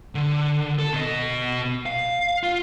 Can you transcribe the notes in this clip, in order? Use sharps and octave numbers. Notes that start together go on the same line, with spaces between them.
D3
A4
B2 D#5
F5
F4